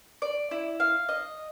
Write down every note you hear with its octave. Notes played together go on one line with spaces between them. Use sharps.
D5
E4
F5
D#5